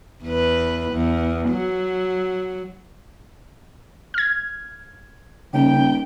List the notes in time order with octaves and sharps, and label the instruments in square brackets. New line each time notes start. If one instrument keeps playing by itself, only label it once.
[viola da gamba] E2 B4
E2
F#3
[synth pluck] F6 G#6
[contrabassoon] D#1 [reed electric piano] C#3 C#4 [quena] G5